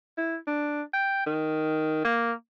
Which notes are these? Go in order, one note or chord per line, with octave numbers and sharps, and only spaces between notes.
E4
D4
G5
D#3
A#3